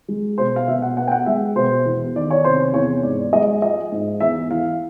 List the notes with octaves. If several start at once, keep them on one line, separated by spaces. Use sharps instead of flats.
G#3
B2 C5
F5
B2 E5
F#5
B3 F#5
G5
F#5
G#3 E5
B2 C5
E2
D#3 D5
C#5
C3 C5
E2 C#5
G#2 D5
G#3 D#5
F3 D#5
G#2
E2 E5
E3 F5